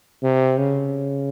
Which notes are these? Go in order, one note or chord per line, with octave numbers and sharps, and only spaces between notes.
C3
C#3